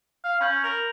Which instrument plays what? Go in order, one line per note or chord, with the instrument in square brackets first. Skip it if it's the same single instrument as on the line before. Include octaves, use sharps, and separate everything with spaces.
[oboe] F5
[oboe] C#4 [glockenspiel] B5 G6 F#7
[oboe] A#4 [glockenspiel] F7